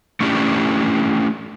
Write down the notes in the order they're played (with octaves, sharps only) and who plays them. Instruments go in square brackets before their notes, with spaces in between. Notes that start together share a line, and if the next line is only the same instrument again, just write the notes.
[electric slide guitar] A3 C#4 D4 E4 G4